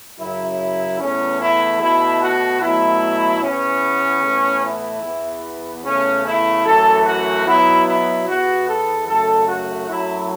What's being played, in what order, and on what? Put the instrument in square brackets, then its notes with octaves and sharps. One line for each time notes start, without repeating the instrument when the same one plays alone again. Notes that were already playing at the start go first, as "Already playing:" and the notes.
[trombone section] F#2 C#3 F#3 E4
E2 E3 A3 C#4
E4
B2 A3 E4
F#4
B2 F#3 A3 E4
E2 E3 B3 C#4
A2 E3 B3
E4
E2 E3 B3
E2 C#3 A3 C#4
E4
F#2 E3 A3 A4
F#4
B2 F#3 B3 E4
E4
E2 E3 B3 F#4
A4
F#2 C#3 A3 A4
F#4
F#2 F#3 A3 E4